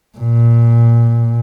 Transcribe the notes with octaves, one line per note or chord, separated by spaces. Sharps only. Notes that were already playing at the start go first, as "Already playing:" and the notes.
A#2